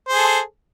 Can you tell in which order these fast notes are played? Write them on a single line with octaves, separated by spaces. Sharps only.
C5 G#4 A4